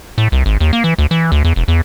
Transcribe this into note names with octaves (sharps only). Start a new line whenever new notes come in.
A2
C2
G#1
D#2
A#3
E3
D2
E3
D2
E2
E1
E2